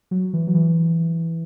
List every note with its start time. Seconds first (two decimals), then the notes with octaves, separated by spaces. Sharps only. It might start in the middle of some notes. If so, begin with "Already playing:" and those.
0.11 F#3
0.33 E3
0.47 F#3
0.54 E3